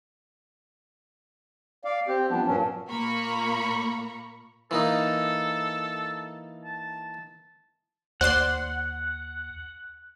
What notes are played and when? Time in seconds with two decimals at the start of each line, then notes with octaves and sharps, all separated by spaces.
1.85 D5 F5
2.08 C4 G4
2.30 F3 G3 B3 D4
2.46 G2 A#2 F3 F#3 C#4 D4
2.89 A#2 A#3 A#5 B5 C#6
4.71 E3 A#3 D#4 A4
6.64 A5
8.21 D#2 C5 D5 F#5 C6 F#6